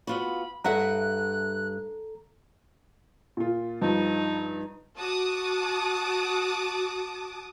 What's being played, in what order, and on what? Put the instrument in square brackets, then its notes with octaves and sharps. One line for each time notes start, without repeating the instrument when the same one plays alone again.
[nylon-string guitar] B3 F4 F#4 [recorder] B5
[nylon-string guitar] G2 E5 F#5 [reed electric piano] A4 A#5 [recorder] F#6
[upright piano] A#2 F4
[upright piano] G2 F3 [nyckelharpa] D#4
[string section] F#4 A5 D6 D#6